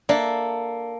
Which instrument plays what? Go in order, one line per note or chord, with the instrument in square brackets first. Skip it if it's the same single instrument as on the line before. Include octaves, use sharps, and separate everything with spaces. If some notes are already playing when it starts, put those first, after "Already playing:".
[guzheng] A#3 A4 [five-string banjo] D4 D5 E5